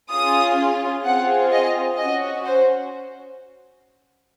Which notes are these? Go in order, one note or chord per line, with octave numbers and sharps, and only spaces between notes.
C#4 F4 G#4 D#6
C4 F4 G#4 F#5
D#5
C#4 F#4 D#5
C5